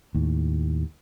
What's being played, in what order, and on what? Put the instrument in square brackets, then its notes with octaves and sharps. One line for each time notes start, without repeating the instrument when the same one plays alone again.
[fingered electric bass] D#2 A2